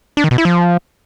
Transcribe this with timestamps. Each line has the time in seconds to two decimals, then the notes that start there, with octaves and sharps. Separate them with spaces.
0.17 D4
0.24 D#3
0.31 B2
0.38 E4
0.45 F3